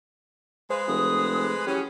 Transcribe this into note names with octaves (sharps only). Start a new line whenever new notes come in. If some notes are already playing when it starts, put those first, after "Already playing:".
G#3 G#4 B4 C5 F5
F1 D#6
E3 F#3 C#4 G4 G#4